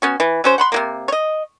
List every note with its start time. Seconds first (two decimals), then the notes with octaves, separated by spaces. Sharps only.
0.02 B3 C#4 F#4
0.20 E3
0.44 F#3 C#4 C5
0.58 F#5 B5 C6
0.72 C3 F#3 A#3
1.08 C#5 D#5